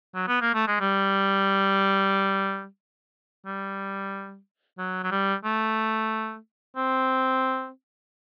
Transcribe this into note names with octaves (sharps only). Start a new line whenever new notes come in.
F#3
B3
A#3
A3
G#3
G3
G3
F#3
F#3
G3
A3
C4